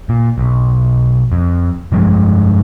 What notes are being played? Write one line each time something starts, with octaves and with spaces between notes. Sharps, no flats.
A#2
B1
F2
F1 G2 F3 G#3